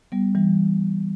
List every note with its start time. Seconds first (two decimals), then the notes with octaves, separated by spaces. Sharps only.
0.12 G3 B3
0.35 E3 G3